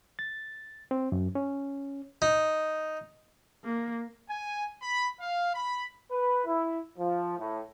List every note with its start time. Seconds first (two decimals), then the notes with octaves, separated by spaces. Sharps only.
0.19 A6
0.91 C4
1.12 F#2
1.35 C#4
2.22 D#4
3.64 A#3
4.30 G#5
4.81 B5
5.19 F5
5.54 B5
6.11 B4
6.46 E4
6.99 F3
7.38 A2